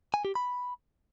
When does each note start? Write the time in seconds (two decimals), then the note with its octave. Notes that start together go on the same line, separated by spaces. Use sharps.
0.14 G#5
0.25 G4
0.35 B5